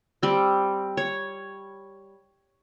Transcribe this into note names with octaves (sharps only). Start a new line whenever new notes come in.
G3 C4
C#5